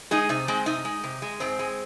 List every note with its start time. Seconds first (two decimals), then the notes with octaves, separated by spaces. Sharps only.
0.11 G#3 D#4 G#4
0.29 C3 D#4
0.48 G#3 C4
0.66 C3 D#4
0.85 G#3
1.04 C3
1.22 G#3
1.40 G#2 C4
1.59 G#3